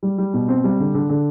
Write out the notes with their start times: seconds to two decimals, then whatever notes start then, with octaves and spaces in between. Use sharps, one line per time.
0.03 G3
0.18 G3
0.34 B2
0.48 C4
0.64 G3
0.80 D3
0.94 D3
1.09 D3